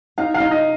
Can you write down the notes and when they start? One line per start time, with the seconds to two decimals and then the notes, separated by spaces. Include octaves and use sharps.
0.18 D#4 F5
0.34 F5
0.40 D#4
0.51 D#5